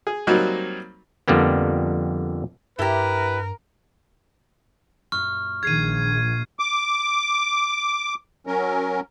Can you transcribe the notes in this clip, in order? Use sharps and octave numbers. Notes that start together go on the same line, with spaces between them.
G#4
F#3 G3 A#3 C4 D#4 F#4
F2 D3 G3 A#3 B3
G2 E4 G4 A#4 B4
F#2 A#2 C#6 F6
A#1 D#3 G#4 G#6 C7 D#7
D6
F#3 C#4 A#4